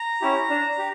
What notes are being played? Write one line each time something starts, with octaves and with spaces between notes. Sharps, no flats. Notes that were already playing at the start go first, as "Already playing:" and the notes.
Already playing: A#5
C#4 E4 G4
D4
G4